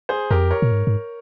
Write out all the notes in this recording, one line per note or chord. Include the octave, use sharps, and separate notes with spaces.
G#4 C5
F2 G4 A#4
A#4 C#5
A#2
G#2
G#2